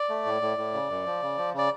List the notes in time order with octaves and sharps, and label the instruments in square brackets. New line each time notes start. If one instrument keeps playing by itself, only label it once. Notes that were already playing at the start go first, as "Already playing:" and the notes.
Already playing: [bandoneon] D5
A3
A2
A2
A2
C#3
F#2
F3
C#3
F3
C#3 D5